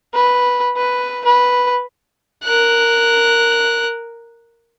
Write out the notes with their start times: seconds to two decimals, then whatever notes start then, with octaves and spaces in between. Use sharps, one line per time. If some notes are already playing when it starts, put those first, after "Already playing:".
0.14 B4
0.77 B4
1.25 B4
2.44 A#4 F#6